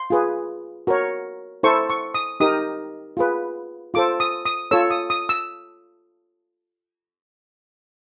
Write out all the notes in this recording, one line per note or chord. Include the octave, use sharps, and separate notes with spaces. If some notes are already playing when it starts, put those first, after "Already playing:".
Already playing: C6
F4 G#4 B4
F#4 A#4 C#5
E4 A4 C5 C#6
C#6
D#6
D#4 G4 A#4 D#6
F4 G#4 B4
F4 A4 C5 D6
D#6
D#6
F4 A4 C#5 E6
D#6
D#6
E6